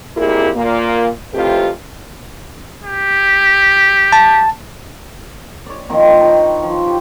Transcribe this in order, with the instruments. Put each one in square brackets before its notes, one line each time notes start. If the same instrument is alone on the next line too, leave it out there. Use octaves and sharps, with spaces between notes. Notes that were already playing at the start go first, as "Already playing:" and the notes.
[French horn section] F2 A#2 E4 G4 G#4 A#4
A#2 A#3
F2 A2 C3 F4 G4 B4
[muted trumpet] G4
[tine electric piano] A5
[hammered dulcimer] C#5 D5
D#3 F3 A#3 C4
B4
D#4 C#5
F3
G4